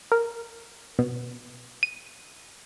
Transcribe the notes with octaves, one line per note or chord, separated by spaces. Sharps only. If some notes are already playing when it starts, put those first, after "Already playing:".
A#4
B2
D#7